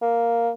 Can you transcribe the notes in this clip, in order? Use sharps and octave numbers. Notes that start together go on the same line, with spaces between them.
A#3